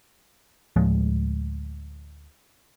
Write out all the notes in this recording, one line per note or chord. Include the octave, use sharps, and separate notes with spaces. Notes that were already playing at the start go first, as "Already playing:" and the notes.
D2 A2 F3 G#3